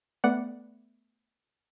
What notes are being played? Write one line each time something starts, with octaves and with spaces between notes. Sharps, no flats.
A3 B3 D5 F#5